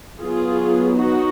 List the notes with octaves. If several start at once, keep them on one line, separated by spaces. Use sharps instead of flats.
F#3 B3 F4 G#4
D#4 F#4